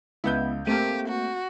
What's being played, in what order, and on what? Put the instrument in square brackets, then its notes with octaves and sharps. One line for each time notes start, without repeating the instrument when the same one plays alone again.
[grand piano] C#2 G6 [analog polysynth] B3 E4
[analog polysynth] A3 A#3 [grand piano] C4 D#7 [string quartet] G4
[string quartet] F#4